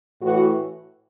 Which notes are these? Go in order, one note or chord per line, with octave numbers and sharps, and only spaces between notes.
A2 E3 F#4